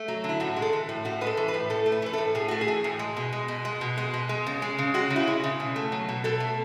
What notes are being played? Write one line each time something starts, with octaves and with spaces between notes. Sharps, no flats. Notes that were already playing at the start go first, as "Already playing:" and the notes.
Already playing: A3
F#3
D3
E4
A2 F#4
G#3
A4
E3
A2
A2 F#4
G#3 B4
A4
E3
B4
A2
A2 A4
A3
B4
E3 B4
A2 A4
A2 G#4
A3 F#4
G#4
E3
A2
G#3
B2
G#3
B2
G#3
B2
G#3
B2
G#3
C#3
G#3
C#3
G#3 F#4
C#3
E4
G#3
C#3
B2
A3
F#3
B2
B2 A4
A3